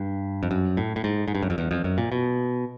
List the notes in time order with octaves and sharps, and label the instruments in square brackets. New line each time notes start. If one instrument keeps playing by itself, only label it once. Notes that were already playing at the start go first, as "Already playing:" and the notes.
Already playing: [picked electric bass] G2
F2
F#2
A2
A2
G#2
G#2
G2
F#2
F2
E2
F2
F#2
A#2
B2